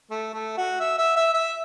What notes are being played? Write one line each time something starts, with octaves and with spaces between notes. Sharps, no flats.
A3
A3
F#4
E5
E5
E5
E5